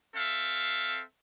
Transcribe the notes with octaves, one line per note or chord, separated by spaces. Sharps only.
C4 A4 E5 F5